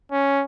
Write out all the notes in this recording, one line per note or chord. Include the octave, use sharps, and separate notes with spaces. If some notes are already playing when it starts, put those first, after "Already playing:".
C#4